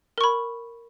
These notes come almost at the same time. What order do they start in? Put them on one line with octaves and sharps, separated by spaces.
A#4 C#6 B5